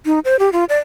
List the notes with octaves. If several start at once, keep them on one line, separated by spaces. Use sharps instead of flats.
D#4
C5
G4
F4
D5